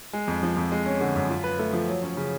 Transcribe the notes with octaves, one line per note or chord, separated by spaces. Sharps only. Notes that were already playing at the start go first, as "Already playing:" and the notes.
G#3
F2
F3
F2
G#3
C#4
D3
F#2
F4
B4
A3
F3
F#3
C#4
C#3